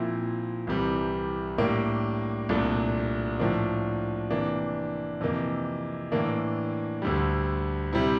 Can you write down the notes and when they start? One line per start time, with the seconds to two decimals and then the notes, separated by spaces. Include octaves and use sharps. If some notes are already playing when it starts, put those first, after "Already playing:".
Already playing: A#2 F3 C4 E4
0.67 C2 C3 E3 G3
1.58 A2 G3 A#3 D4
2.49 C2 A#2 A3 D4
3.39 A2 F3 A#3 D4
4.31 C3 E3 A#3 D4
5.21 F2 C3 E3 A#3
6.12 A2 E3 A#3 D4
7.02 D2 D3 G3
7.93 C3 G3 C4 E4